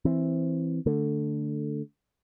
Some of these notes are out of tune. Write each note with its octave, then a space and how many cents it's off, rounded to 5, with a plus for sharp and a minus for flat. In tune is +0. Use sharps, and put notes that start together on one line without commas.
E3 +0 C4 +0
D3 +0 A3 +5